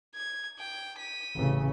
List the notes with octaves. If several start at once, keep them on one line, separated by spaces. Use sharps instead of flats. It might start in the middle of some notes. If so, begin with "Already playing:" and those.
G#6
G5
B6 D#7
A1 C#3